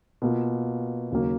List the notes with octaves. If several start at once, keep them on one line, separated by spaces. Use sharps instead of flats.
B2 A#3 F4
D#2 C#3 F#3 A#3